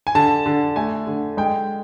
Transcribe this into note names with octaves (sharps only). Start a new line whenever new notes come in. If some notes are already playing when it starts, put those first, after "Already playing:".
G#5
D3 A5
D3
A3 G#5
D3
G#3 G5